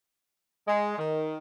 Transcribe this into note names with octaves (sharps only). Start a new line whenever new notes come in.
G#3
D#3